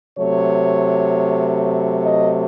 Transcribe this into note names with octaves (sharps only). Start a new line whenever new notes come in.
C3 F#3 A3 C#5
D#5